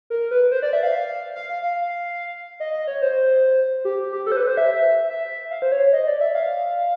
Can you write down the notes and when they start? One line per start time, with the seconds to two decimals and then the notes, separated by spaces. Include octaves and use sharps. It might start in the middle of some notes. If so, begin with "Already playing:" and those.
0.10 A#4
0.31 B4
0.52 C5
0.62 D5
0.73 E5
0.83 F5
1.35 F5
1.49 F5
1.63 F5
2.60 D#5
2.74 D#5
2.87 C#5
3.02 C5
3.85 G4
3.99 G4
4.13 G4
4.26 A4
4.32 C5
4.37 B4
4.47 C5
4.57 E5
5.09 E5
5.51 F5
5.62 C5
5.72 C#5
5.93 D#5
6.07 D5
6.21 E5
6.35 F5